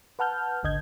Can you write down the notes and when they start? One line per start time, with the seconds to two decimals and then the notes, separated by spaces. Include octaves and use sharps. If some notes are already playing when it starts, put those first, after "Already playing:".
0.19 B4 F#5 A5 F6 G6
0.63 G#1 D2 D3 D#5 G6 G#6